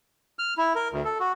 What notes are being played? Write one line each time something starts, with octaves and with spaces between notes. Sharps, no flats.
F6
E4
A#4
D2
A4
F#4